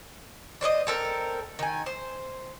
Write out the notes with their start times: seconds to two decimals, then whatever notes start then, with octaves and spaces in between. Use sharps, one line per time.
0.61 D4 C5 C#5 D#5
0.87 C4 A4 A#4
1.59 D#3 G#5
1.86 C5